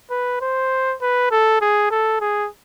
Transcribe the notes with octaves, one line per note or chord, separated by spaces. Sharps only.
B4
C5
B4
A4
G#4
A4
G#4